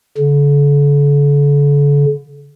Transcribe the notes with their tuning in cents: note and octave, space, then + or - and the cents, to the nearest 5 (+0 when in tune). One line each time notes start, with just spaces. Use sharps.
D3 -40